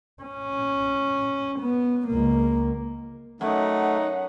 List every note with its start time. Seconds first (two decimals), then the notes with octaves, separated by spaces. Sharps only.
0.23 C#4
1.60 B3
2.08 C#2 A#3
3.41 F#2 A3 D#4 F#5